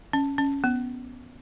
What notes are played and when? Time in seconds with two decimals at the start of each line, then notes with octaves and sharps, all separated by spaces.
0.13 C#4
0.38 C#4
0.64 B3